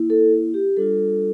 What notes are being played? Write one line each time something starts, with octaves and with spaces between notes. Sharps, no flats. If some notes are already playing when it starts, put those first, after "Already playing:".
Already playing: A#3 E4
A4
G4
G3 D4 F4 A4